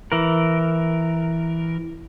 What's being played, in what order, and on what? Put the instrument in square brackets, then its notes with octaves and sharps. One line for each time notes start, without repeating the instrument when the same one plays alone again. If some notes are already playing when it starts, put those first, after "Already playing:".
[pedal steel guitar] E3 A#4